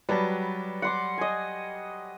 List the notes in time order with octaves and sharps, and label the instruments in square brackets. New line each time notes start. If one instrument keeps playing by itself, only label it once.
[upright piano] F#3 G3 [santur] B4 A5
[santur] F#5 C6 D6
D#5 G#5